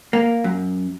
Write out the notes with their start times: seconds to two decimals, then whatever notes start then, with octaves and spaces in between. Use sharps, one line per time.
0.13 A#3
0.44 F#2